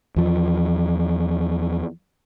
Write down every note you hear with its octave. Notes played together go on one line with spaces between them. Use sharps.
E2 F3